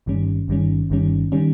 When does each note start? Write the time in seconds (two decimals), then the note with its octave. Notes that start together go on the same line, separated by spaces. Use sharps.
0.06 G1 G2 D#3 G3 C#4
0.48 G1 G2 D#3 G3 C#4
0.90 G1 G2 D#3 G3 C#4
1.32 D#3 G3 C#4